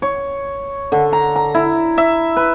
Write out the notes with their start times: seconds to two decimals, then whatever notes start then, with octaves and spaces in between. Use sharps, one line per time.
0.02 C#5
0.92 D3
1.13 A#5
1.36 A#5
1.54 E4
1.98 E5
2.37 B4